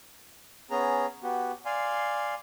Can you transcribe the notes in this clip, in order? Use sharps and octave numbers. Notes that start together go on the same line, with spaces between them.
B3 C#4 G#4 A#5
B3 F#4 G4
D5 F5 G#5 C6